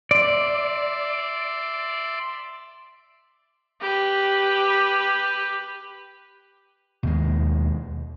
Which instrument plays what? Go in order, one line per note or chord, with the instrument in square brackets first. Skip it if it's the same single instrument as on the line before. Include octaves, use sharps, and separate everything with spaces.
[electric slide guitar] D5 [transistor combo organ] E5 C6 D6
[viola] G4 B4
[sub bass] D#2 [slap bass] B2 D#3 G#3